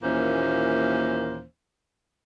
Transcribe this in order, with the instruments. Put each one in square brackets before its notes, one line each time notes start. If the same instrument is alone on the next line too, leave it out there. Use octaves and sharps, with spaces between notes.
[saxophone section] D#2 A#2 E3 A#3 C#4 C5